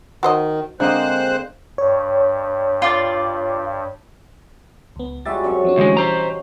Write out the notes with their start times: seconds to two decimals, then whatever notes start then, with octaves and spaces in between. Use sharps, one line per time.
0.23 D#3 F#4 C5 D#5
0.80 D3 G#3 A#3 C4 G#4 C5 D#5 F#6
1.78 G2 C#5
2.82 F4 D5
4.96 C#2 B3
5.25 G3 G#3 F#4 E5 A6
5.44 F#2 C3 C#5 D5
5.64 F3 C4 D4
5.78 D2 E3 G3 G#3 C#4 D#5 F5
5.97 C5 A#5